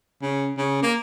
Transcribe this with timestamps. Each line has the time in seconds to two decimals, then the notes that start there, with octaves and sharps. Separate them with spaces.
0.22 C#3
0.57 C#3
0.83 A#3